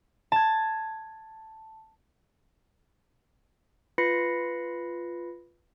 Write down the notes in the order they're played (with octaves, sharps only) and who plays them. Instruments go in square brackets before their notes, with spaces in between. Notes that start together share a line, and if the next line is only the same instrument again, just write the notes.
[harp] A5 G#6
[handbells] F4 B4 B5 A#6 C7 C#7